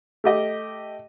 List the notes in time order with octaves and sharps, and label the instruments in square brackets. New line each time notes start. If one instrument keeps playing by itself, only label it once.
[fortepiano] A3 G4 D#5